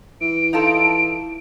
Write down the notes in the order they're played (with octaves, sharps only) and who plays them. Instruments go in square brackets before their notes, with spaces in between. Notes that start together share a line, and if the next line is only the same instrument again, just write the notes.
[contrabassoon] E3 [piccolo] D7
[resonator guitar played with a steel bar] D#4 F4 A4